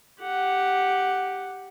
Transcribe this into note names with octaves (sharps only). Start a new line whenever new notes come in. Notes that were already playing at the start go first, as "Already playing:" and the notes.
G4 F#5